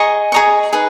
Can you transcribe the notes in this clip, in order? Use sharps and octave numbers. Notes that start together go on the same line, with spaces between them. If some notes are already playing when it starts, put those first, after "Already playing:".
Already playing: G#4 D#5 A#5 C#6
G#4 D#5 A#5 C#6
D#4 G#4 B4